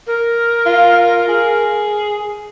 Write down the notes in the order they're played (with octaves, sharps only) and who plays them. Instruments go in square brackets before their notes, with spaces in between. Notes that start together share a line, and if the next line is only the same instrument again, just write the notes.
[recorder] A#4
[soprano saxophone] F4
G#4